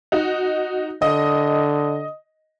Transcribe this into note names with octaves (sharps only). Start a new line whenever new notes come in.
D#4 F#4
D3 D#5